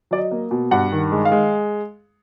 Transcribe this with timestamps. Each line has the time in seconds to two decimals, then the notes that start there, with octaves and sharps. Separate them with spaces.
0.11 F#3 D5
0.18 D#5
0.31 A#3
0.51 B2
0.71 G2 F#5
0.92 D#3
1.12 G#3
1.25 F5
1.32 G#3